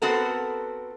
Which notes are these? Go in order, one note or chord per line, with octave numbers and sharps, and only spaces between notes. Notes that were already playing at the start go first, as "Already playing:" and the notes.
B3 C4 F#4 A4 A#4